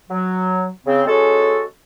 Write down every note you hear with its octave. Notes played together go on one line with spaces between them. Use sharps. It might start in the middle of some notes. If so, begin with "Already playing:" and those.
F#3
C#3 C4
G#3 C#4 F#4 A4